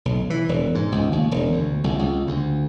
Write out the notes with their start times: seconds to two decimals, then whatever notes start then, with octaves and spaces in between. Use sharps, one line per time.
0.05 B1
0.30 E3
0.49 E1
0.75 G#2
0.92 C#2
1.12 D#2
1.31 E1
1.52 D2
1.84 C2
1.99 C#2
2.27 D2